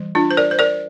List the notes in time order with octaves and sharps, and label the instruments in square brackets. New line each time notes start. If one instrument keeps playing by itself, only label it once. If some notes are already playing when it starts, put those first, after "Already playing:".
Already playing: [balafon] E3 G3
D4 F4
C5
A#4 D5
C5
A#4 D5